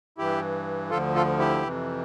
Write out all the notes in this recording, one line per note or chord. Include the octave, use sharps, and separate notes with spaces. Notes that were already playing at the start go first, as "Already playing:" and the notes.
G2 E3 E4 G4
D2 D3 F3 F4 A4
F4 A4
E4 G4
F2 C3 E3